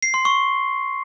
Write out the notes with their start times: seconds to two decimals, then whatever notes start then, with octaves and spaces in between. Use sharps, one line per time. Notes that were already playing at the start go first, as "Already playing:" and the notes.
0.03 C7
0.14 C6
0.25 C#6